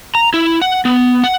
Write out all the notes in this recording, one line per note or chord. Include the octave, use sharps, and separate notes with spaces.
A#5
E4
F#5
B3
F#5